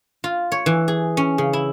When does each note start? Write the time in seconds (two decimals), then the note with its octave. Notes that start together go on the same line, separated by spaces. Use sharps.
0.24 F4
0.52 C#5
0.66 E3
0.88 G#4
1.17 C#4
1.38 C#3
1.53 E4